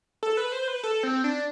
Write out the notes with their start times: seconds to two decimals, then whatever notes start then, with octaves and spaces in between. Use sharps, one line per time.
0.23 A4
0.37 B4
0.52 C5
0.68 B4
0.83 A4
1.03 C4
1.24 D4